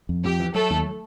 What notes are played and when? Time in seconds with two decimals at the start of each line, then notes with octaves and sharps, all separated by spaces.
0.09 F2
0.24 F2 G4
0.40 E3
0.54 F#3 A3 A4
0.70 D#2